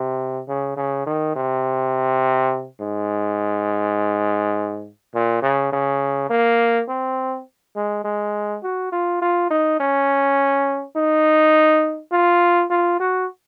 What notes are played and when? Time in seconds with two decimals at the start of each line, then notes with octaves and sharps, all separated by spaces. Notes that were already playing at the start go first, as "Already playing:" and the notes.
Already playing: C3
0.48 C#3
0.77 C#3
1.07 D#3
1.36 C3
2.81 G#2
5.14 A#2
5.42 C#3
5.73 C#3
6.30 A#3
6.89 C4
7.76 G#3
8.05 G#3
8.63 F#4
8.92 F4
9.22 F4
9.51 D#4
9.80 C#4
10.96 D#4
12.12 F4
12.70 F4
13.00 F#4